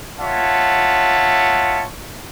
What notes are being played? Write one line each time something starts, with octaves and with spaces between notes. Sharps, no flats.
F4 C#5 E5 F#5 A5